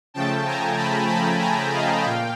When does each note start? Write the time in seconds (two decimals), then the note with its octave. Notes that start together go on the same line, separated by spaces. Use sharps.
0.14 C#3 F3 A3 G5 A5
0.46 G#5 A#5
0.77 A5 B5
1.09 A5 B5
1.41 G#5 A#5
1.72 D#5 F5
2.04 A#2 F5 G5